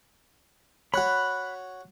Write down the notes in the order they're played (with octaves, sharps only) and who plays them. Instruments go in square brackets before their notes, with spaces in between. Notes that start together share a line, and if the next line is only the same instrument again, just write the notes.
[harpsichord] F#4 C#5 [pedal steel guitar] B5 F#6